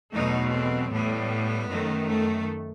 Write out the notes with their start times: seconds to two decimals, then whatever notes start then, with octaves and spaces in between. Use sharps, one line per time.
0.13 E2 B2 F#3 A3 D#4
0.52 C4
0.91 A2 G3 B3
1.68 F#2 D#3 A3
2.07 A3